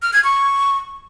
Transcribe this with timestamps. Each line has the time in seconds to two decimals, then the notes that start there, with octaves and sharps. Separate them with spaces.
0.02 F6
0.13 G#6
0.24 C#6